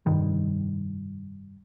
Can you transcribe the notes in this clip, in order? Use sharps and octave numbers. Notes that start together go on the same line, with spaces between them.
F1 G2 D#3 G3